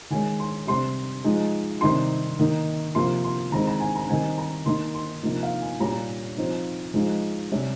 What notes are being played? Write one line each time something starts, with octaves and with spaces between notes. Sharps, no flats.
D#3 G#3 C#4 G#5
C6
C3 G3 C4 C6
F3 G#3 D#4
C3 D#3 G3 C4 D#4 C6
D#3 A#3 D#4
C3 F3 A#3 C6
C6
D#3 G#3 C4 D#4 A#5
A#5
G#5
A#5
D#3 G3 C4 D#4 G#5
A#5
D#3 A#3 D#4 C6
C6
C3 F3 A#3 D#4
F5
G#5
A#2 G3 C#4 A#5
F3 C4 D#4
F3 G#3 D#4
C3 G3 C#4